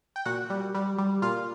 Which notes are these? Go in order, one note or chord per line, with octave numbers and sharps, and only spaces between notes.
G5
A#2 F#4 F#5
G3
G3
G3
A#2 F4 F5